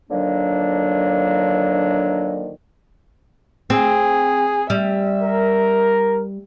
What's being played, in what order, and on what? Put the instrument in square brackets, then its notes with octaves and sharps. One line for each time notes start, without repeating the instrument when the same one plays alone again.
[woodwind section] D3 D#3 F3 F#3 A#3 D4
[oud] C4 [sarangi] G#4
[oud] G3 [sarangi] E5
[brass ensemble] A#4